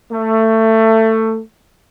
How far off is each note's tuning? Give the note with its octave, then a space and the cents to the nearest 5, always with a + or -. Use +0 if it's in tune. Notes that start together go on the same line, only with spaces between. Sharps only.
A3 +20